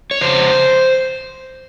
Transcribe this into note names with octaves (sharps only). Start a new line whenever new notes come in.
C#5
F2 C#3 C5